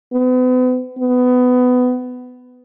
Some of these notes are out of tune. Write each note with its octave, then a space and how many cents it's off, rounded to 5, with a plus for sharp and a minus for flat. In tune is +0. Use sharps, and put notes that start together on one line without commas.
B3 +40
B3 +20